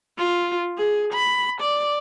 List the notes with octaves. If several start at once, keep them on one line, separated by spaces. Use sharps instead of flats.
F4
G#4
B5
D5